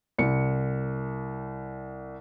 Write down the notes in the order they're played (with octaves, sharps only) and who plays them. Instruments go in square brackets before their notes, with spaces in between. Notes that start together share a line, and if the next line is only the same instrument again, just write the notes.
[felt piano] C2 C#7